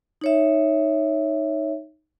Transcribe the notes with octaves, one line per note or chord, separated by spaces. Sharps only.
D#4 C#5 E5